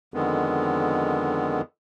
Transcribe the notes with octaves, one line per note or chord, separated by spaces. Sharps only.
F2 D3 D#3 G#3 B3